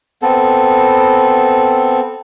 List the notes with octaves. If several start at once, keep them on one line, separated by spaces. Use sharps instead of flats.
B3 C4 A4